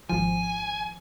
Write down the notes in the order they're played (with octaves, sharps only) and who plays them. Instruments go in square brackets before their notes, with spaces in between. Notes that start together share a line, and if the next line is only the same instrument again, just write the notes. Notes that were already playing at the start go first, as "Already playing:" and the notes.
[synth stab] G#1 F3 [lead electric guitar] G#5